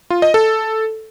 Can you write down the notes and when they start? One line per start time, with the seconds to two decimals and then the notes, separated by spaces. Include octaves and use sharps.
0.10 F4
0.22 D#5
0.34 A4